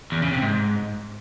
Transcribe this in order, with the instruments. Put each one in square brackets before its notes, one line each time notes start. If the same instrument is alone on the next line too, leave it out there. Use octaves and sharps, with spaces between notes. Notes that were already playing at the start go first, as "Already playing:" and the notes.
[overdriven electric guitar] E2
C#3
C3
G#2